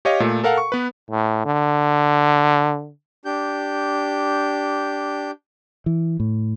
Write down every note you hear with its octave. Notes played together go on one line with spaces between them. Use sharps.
G4 C#5 D#5 F5
A#2 A3
A4 A#4 F5 F#5
C#6
B3 B4
A2
D3
D4 G4 G6
E3
A2